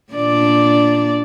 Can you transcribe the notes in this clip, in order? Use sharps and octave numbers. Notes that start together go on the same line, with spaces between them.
A#2 D4 D5